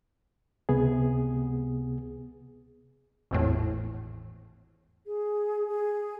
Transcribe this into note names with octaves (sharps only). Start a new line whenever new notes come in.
C#2 C3 B3 G#4
G#1 E2 A2
G#4
G#4